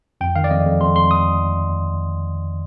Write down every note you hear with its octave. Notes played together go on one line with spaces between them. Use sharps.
F2 G5
D#3 F5
D5
F2 D#5
F2
F2 C6
F2 C6
D#6